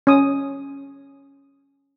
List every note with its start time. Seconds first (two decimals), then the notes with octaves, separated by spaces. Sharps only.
0.07 C#4 D#6